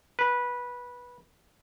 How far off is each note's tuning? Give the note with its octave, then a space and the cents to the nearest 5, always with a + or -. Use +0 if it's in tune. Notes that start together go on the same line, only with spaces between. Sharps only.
B4 -15